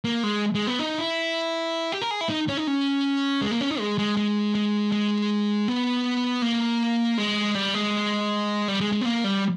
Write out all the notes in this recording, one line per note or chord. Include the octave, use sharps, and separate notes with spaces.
A#3
G#3
G#3
B3
D#4
E4
G4
A#4
G#4
E4
D#4
C#4
D#4
C#4
G#3
A#3
C#4
D#4
G#3
G#3
G#3
G#3
G#3
B3
A#3
G#3
G3
G#3
G3
G#3
G#3
B3
A#3
G3